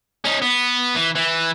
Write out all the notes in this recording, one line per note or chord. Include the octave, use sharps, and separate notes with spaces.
C#4 D#4
B3
E3
E3